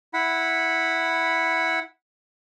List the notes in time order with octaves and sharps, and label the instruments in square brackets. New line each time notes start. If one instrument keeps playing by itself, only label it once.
[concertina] E4 F#5 B5